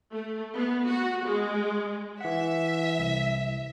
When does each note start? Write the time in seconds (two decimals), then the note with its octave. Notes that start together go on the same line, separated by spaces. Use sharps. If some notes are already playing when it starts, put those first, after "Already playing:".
0.12 A3
0.54 B3
0.88 F#4
1.25 G#3
2.21 E3 E5 F#5
2.99 C2